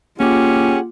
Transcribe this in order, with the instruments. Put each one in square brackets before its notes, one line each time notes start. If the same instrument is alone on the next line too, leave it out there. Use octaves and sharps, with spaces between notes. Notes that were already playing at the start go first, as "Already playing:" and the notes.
[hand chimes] A#3 D6 [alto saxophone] C#4 [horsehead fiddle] F4 [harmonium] G4 G#4 F#5